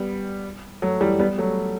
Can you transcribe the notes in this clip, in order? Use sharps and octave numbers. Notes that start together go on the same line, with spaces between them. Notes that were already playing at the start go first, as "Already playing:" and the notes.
Already playing: G3 B3
F#3 A3
E3 G3
G3 B3
F#3 A3